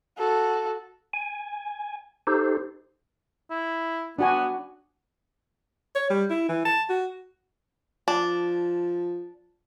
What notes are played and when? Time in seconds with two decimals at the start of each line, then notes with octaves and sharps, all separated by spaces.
0.18 F#4 A4
1.13 G#5
2.27 D#4 G4 A4 C5
3.50 E4
4.19 B3 D4 F#4 G#5
5.95 C#5
6.10 G3
6.30 E4
6.49 E3
6.65 A5
6.89 F#4
8.08 F3 D4